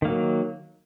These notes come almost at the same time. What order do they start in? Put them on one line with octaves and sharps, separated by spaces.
D#3 A#3 F#3